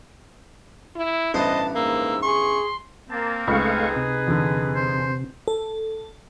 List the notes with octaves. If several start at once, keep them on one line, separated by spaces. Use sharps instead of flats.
E4
A1 G2 B3 C5 D#5 A5
G#2 A#3 E6
G#4 C6 C#6
A#3 C4 A5
C#2 A3 D#4 G#4 B4 F5 B5 C#6
C3
E2 D3
C5
A4